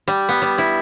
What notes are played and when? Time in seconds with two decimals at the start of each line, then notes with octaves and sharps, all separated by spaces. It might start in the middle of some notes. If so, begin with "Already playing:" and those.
0.08 G3
0.29 B3
0.42 G3
0.58 E4